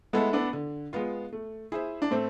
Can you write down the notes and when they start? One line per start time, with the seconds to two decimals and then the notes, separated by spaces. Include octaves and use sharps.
0.13 G#3 A3 B3 E4 A4 E5
0.33 B3 D4
0.53 D3
0.93 G#3 B3 F4
1.33 A3
1.72 E4 G#4 C5 E5
2.02 D4
2.11 A2 A3 C4